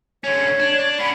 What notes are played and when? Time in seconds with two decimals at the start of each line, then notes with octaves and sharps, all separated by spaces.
0.24 D3 C#4 C#5
0.60 D4
0.79 D4
0.99 B3 C#4 B5